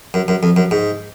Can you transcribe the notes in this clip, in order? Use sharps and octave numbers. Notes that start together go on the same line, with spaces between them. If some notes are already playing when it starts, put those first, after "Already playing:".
F#2
F#2
F2
F#2
G#2